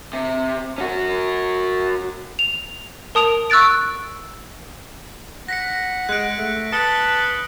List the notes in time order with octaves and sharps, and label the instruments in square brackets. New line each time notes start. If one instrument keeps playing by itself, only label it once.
[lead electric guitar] C3
C#4 F#4
[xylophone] F7
A#4 A5 D#6 D7 F7
C#6 E6 F#6 A6 D7
[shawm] F#5 [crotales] A#6 B6 C#7
[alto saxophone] G#3 [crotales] F#6 D7
[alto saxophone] A3
[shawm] B4 [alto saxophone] A5 [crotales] D#6 C#7 G7